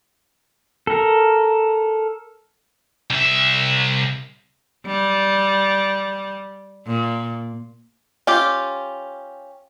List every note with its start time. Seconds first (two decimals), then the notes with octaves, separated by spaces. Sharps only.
0.87 A4 A#4
3.10 C2 E5
4.86 G3
6.87 A#2
8.27 C#4 F4 G4